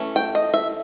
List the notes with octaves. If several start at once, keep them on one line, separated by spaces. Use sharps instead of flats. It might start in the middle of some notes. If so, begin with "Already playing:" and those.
Already playing: E3 A3 C#4
G5
D#5
E5